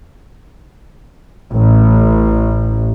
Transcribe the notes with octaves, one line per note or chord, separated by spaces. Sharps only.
A1